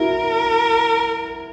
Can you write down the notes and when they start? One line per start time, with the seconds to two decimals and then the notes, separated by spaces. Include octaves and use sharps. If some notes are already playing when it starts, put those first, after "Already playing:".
Already playing: E4 F#4 A#4